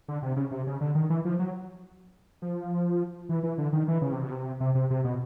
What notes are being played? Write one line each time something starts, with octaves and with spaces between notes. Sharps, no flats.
D3
C3
C#3
C3
C#3
D3
D#3
E3
F3
F#3
F3
E3
E3
D3
D#3
E3
C#3
C3
B2
C3
C3
C3
C3
B2